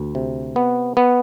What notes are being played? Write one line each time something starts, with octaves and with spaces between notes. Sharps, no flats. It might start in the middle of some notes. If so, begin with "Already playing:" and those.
Already playing: D2
C3
B3
B3